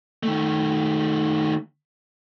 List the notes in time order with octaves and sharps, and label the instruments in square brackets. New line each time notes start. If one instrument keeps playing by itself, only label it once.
[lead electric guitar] D#3 A3